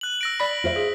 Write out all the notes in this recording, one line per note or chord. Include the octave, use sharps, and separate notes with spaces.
F#6 F#7
E6 A#6 D7
D5 B5 B6
F4 C5 E5
G#4